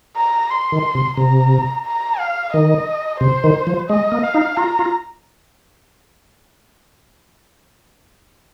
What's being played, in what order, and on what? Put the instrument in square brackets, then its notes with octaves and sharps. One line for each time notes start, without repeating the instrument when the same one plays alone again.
[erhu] A#5
C6
[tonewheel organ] D#3
C3
[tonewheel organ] C3 [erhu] A#5
[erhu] A#5
F5
[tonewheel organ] D#3 [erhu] D#5
[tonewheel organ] C3 [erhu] C5
[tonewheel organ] D#3
F3
[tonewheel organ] G#3 [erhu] D#5
[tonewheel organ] A#3
[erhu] F5
[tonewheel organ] D#4
[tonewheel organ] F4 [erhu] A#5
[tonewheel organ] F4